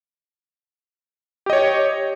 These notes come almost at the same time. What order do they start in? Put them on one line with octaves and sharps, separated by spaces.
G4 D#5 C#5